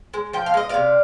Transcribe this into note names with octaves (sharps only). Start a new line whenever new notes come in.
G#3
F3 G5
F5
G#3 D#5
C3 D5 F5